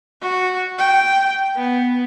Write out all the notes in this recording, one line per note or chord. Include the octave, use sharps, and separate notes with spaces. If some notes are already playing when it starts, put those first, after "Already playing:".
F#4
G5
B3